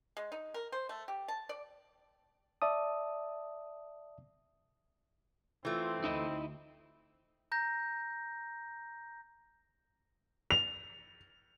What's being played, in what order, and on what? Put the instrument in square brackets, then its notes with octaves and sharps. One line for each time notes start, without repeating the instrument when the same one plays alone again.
[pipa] G#3
D#4
A#4
C5
A3
G4
A5
D5
[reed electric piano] D5 E5 A5 D#6
[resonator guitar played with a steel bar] E3 A3 [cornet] C4 [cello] F4
[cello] D2 [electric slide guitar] D#4 E4 D#5
[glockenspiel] A#5 G6 A#6
[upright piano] F7